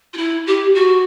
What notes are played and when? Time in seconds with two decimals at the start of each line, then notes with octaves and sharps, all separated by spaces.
0.13 F4
0.17 E4
0.47 G4
0.75 F#4